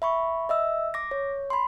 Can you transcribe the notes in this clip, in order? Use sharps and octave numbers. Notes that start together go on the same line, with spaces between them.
E5 B5 C#6
D#5 E5 E6
D6 A#6
C#5
B5 C6